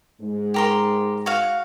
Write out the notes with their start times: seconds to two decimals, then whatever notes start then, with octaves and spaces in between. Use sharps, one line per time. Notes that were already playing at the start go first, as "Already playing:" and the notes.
0.21 G#2 G#3
0.54 G4 A#4 C6
1.26 F#4 F5